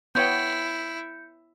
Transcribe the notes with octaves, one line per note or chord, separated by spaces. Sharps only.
B3 E4 C#5 G5 G6 C#7